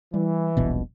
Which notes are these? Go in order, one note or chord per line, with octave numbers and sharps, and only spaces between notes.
E3 G3
D#1 A#1 B2